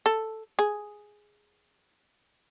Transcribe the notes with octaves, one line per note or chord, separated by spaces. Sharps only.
A4
G#4